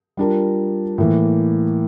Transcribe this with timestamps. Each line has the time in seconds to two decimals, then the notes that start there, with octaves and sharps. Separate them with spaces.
0.17 G3 D4 F4 A#4
0.98 A2 E3 A#3